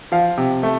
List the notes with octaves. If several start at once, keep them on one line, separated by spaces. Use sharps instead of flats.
F3 F5
C3
A3